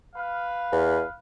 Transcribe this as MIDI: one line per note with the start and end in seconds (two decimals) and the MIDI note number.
0.16 1.17 71
0.16 1.17 77
0.72 1.03 40